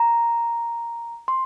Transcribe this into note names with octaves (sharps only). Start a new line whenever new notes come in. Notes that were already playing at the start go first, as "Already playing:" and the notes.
Already playing: A#5
C6